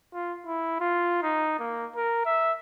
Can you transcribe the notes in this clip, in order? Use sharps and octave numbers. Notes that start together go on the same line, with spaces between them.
F4
E4
F4
D#4
A#3
A#4
E5